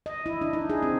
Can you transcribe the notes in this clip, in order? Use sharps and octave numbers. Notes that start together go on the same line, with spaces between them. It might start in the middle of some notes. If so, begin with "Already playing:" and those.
D#5
E4
D4
D#4
G#4
C4